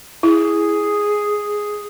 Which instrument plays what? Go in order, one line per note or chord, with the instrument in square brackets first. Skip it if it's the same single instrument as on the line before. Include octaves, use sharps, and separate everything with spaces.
[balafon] E4 [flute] G#4